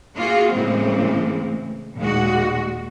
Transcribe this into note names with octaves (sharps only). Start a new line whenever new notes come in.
A#3 F4 F#4 G#4
A2 C#3 E3 G#3 A#3 C4
D#2 A#2 G#3 F#4